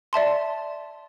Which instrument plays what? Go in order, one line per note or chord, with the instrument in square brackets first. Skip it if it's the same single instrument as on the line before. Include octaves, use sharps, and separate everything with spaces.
[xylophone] D5 E5 A5 C6